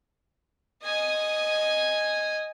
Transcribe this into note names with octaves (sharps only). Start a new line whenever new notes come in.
D#5 G#5